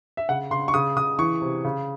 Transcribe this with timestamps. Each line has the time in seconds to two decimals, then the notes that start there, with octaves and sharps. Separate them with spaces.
0.17 E5
0.29 C#3 F#5
0.51 C#3 C6
0.68 C#6
0.74 C#3 D#6
0.96 C#3 D#6
1.19 E3 C#6
1.42 C3
1.65 C#3